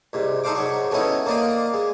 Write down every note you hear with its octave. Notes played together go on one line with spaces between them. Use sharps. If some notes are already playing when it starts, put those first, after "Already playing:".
C2 G#2
D#4 A4 C5 F5 D6
G#2 F#3 F#4
F#3 A3 B3 C#4 D#4 E4
A#3 C4 D5 D#5 F5
G#3